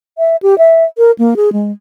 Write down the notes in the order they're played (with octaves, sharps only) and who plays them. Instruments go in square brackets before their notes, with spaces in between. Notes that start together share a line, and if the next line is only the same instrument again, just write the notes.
[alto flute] E5
G4
E5
A#4
A#3
G#4
G#3